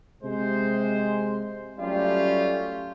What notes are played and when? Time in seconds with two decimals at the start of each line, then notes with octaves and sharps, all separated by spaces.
0.23 C3 G#3 C5
1.79 F#3 G3 A3 C#4 F4 G4